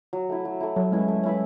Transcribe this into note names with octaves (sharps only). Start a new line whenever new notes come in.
F#3
A3 E4
F#3
A3 E4
F#3 A3
G#3 C#4 E4 B4
A3
C#4 E4 B4